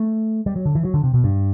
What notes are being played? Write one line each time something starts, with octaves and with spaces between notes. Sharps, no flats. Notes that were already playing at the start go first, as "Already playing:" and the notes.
Already playing: A3
G3
F#3
D3
E3
F#3
D3
C3
B2
G2